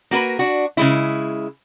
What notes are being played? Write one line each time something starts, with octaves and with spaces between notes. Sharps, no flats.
A#3 F#4 A#4 B4
D4 F#4
C#3 G#3 E4